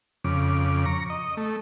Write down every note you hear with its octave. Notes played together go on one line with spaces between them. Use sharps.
F2 C#3 D6
A#5 C#6
D#5
A3